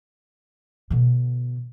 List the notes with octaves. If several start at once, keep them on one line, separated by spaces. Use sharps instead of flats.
B2 D3